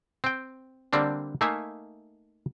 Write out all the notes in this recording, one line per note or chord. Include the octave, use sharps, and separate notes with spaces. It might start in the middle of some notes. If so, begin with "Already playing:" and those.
C4 G5
D3 G3 A#3 C4 D4
A3 A#3 D#4 E5 F5 G#5